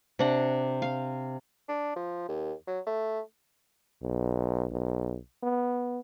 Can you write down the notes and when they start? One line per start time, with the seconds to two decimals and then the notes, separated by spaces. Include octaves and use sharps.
0.19 C3 D4 F#5
0.82 F5
1.68 D4
1.96 F3
2.29 D#2
2.67 F#3
2.86 A3
4.03 B1
4.72 B1
5.43 B3